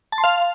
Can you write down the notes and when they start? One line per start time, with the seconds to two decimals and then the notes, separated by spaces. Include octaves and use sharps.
0.12 A5
0.18 C6
0.24 F5